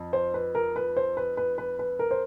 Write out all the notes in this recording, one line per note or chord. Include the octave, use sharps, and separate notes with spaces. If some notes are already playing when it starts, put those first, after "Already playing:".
Already playing: F2
C5
B4
A#4
B4
C5
B4
B4
B4
B4
A#4
C5